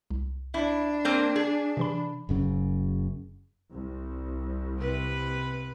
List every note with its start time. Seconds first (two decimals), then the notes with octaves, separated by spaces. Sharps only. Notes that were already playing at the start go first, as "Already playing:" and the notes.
0.10 C2
0.54 D4 E4
1.05 A#3 C4
1.36 G#4
1.77 C3 E3 B5
2.29 F#1 F#2 C#3
3.71 C2
4.79 C3 B4